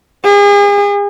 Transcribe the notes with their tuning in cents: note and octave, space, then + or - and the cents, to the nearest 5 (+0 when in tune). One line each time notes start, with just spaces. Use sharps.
G#4 -40